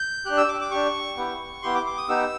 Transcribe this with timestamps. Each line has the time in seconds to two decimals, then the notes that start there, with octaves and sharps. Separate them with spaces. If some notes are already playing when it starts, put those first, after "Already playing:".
Already playing: G6
0.26 D4 G4 F#6
0.37 E6
0.49 D6
0.61 D6
0.71 D4 G4 C#6
1.17 B3 E4 G4
1.62 B3 E4 G4 C6
1.75 D6
1.86 D6
1.97 D#6
2.09 B3 D#4 G4 E6